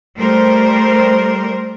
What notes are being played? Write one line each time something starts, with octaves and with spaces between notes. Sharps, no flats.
G3 A3 A#4 C5